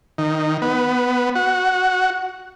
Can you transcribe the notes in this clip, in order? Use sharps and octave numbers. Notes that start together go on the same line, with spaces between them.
D#3
B3
F#4